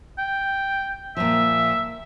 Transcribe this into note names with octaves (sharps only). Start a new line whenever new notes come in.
G5
A#2 F3 E5